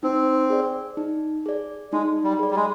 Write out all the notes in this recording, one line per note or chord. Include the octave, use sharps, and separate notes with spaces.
C4 D#4
G#4 D5
D#4
G#4 D5
G#3 D#4
G3
G#4 D5
G3
G#3